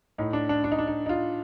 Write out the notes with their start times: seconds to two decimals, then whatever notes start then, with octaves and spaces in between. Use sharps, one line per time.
0.18 A2 D#4
0.33 D4
0.49 D4
0.64 D4
0.72 D#4
0.78 D4
0.87 D#4
1.06 D#4
1.09 F4